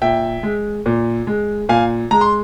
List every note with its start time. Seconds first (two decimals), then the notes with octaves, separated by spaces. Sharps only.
0.02 A#2 E5 G5
0.43 G#3
0.86 A#2
1.27 G#3
1.69 A#2 F5 G#5
2.11 G#3 A#5
2.21 C6